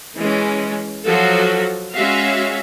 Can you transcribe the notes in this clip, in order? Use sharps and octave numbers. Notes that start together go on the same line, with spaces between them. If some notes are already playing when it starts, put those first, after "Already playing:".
E3 G#3 C#4
F3 F#3 F#4 A4
G#3 C#4 F#4 E5 F5